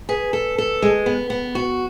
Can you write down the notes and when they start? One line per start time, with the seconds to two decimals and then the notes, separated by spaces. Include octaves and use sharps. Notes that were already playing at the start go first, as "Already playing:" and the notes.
0.09 G#4 B4
0.33 A4
0.58 A4
0.82 G#3
1.06 B3
1.30 B3
1.55 F#4